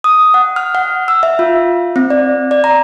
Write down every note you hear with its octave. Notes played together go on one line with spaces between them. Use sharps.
D#6
F#5
F6
F#5
E6
E5
F4
C4
D5
D5
A#5